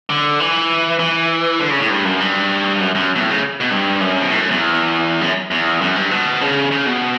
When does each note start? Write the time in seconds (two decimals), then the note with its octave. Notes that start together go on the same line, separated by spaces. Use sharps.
0.10 D3
0.40 E3
0.99 E3
1.60 D3
1.70 C#3
1.80 A2
1.90 G2
2.05 F#2
2.20 G2
2.80 F#2
2.95 F#2
3.16 B2
3.20 A2
3.31 C#3
3.60 B2
3.71 G2
4.00 F#2
4.21 B2
4.31 A2
4.40 F#2
4.51 E2
5.21 F#2
5.51 E2
5.81 F#2
5.96 G2
6.11 B2
6.41 C#3
6.71 C#3
6.86 B2